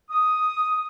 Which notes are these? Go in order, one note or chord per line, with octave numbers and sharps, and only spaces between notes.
D#6